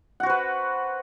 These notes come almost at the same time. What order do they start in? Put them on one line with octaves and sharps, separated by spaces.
F#5 F#4 C5 B4